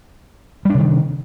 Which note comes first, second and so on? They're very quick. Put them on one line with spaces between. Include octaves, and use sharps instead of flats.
G3 D4 C3 D#3